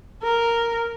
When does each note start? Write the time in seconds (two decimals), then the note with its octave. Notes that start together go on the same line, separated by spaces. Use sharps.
0.23 A#4